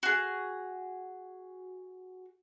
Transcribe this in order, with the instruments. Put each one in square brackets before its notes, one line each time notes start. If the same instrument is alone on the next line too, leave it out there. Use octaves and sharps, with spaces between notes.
[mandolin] F#4 G#4